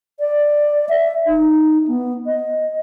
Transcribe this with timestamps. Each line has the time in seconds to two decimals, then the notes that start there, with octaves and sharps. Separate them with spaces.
0.20 D5
0.89 E5
1.27 D#4
1.88 B3
2.27 D#5